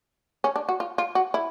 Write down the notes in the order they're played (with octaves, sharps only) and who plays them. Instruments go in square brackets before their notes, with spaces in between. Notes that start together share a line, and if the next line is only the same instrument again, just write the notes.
[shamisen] C#4
D4
F#4
F4
F4
F#4
E4